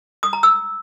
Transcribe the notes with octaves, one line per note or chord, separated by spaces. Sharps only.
D#6
A#5
E6